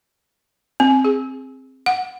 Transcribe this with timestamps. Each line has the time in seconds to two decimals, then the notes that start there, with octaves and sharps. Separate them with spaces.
0.80 C4
1.05 G#4
1.86 F#5